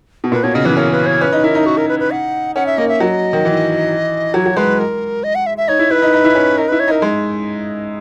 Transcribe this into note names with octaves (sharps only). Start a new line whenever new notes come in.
B2
A#2 B4
B2 C#5
C#3 D#5
E3 B4
C#4 A#4
B4
C#5
C#4 B4
D#4
E4 A#4
D#4
F#4
A#4
B4
B4
F#5
C#4 F#5
E5
A#3 D#5
E5
F#3 D#5
D#3
E3
F#3 C#5
F#3
G#3 B4
A#4
D#5
F#5
E5
E5
D#4 C#5
E4
E4 B4
D#4
D#4
E4
C#4
D#4 A#4
E4 B4
C#5
D#4 A#4
G#3